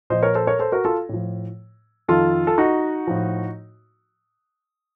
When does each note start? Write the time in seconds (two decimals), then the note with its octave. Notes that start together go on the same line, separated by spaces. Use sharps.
0.10 A#2 F3 C5 D#5
0.23 A#4 C#5
0.35 A4 C5
0.47 A#4 C#5
0.59 A4 C5
0.72 F#4 A#4
0.85 F4 A4
1.09 A2 F3
2.08 F2 D#3 F4 A4
2.47 A4
2.58 D#4 F#4
3.07 A2 F3